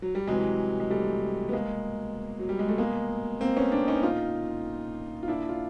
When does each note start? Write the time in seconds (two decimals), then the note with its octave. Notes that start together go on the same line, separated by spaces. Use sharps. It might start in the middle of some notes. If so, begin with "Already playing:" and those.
0.02 F#3
0.15 G3
0.27 C3 E3 F#3 G#3
0.80 G#3
0.91 G3 A3
1.49 B3
1.52 B2 G#3 A#3
2.39 F#3
2.49 G3
2.59 G#3
2.68 A3
2.78 B2 G#3 A#3
3.41 A#3 C4
3.56 B3 C#4
3.72 C4 D4
3.87 C#4 D#4
4.03 A#2 D#4 F4
5.23 F4
5.28 A#2 D4 E4
5.49 F4